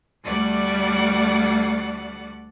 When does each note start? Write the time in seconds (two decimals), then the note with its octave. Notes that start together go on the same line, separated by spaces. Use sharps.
0.24 D2 G3 A3 D5 F#5